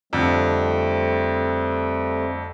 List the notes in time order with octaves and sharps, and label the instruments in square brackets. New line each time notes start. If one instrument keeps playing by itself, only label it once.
[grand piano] F2 D3 [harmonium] G3 A3 C4